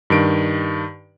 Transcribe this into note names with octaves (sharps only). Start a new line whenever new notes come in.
G2 D#3 D7